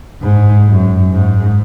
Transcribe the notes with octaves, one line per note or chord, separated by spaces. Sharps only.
G#2
F#2
G#2